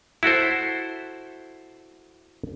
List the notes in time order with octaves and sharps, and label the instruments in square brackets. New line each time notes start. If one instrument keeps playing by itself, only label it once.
[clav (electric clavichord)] E4 F#4 A4 C5